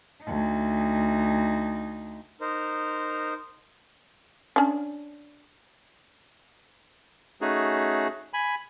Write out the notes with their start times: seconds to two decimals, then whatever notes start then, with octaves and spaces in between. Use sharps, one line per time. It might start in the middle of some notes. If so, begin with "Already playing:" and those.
0.22 D2 D#4
2.41 D#4 A#4 C5
4.56 C#4 D4
7.41 A3 C#4 D#4 F#4 G#4
8.33 G#5 B5